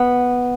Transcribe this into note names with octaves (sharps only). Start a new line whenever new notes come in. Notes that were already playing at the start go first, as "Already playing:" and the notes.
Already playing: B3